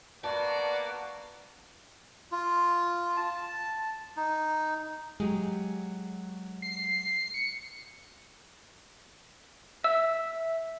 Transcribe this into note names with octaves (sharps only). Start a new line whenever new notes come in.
A#3 B3 F#4 D5 A5
F4
A5
D#4
F#3 G#3 G4 G#4
C7
C#7
E5 E6